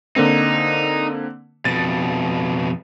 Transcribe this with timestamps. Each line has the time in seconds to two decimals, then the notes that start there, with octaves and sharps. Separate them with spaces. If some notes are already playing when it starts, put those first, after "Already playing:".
0.16 D3 A#3 C4 D#4
1.65 F2 B2 A6